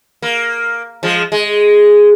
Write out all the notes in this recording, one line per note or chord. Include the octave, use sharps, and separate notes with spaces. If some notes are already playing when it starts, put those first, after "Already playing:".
A#3
F3 G#3
G#3